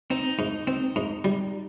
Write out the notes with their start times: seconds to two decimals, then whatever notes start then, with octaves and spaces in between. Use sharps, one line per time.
0.10 C4 D#4
0.39 G#2
0.67 C4
0.96 G#2
1.24 G3